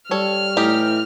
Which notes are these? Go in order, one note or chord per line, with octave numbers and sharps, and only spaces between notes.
G3 A4 C#5 F6
A2 E3 D#4 G4